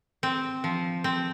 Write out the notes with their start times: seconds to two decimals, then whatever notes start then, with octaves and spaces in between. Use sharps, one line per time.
0.23 C4
0.64 F3
1.04 C4